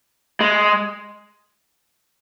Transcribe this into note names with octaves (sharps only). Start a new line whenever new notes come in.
G#3